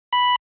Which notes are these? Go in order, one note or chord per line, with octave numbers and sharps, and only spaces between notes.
B5